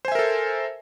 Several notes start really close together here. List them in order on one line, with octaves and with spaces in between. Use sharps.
C5 G#5 E5 A#4 A4